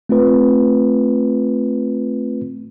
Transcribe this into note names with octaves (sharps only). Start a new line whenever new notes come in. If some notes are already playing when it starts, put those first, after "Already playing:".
A3 C4 F4 B4